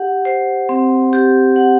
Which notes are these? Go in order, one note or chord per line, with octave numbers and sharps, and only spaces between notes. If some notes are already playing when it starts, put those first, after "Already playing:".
Already playing: G4 F#5
C5
C4
G4
F#5